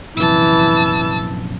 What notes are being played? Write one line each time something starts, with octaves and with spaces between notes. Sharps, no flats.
A#1 F#2 C3 E3 A5 E6